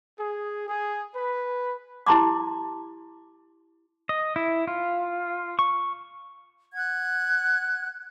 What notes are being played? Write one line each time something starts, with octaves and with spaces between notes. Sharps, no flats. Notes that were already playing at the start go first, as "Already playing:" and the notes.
G#4
G#4
B4
E4 G4 A5 A#5 C6 D6
D#5
E4
F4
C#6
F#5 F#6 G#6